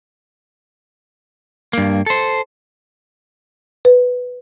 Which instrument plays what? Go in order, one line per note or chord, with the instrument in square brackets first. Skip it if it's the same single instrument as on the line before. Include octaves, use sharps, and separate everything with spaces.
[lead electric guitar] G2 A#3
A4 C5
[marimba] B4